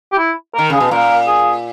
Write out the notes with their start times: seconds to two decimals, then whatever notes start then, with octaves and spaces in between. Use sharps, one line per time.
0.12 G4
0.19 E4
0.55 D#3 A#4
0.70 C#3 G#4
0.80 B2
0.91 A#2 A#4
1.27 G#4